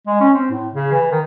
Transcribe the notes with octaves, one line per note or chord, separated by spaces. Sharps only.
G#3
C#4
C4
A2
C#3
E3
D#3